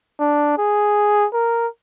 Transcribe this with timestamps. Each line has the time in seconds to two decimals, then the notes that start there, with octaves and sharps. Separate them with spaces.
0.20 D4
0.58 G#4
1.33 A#4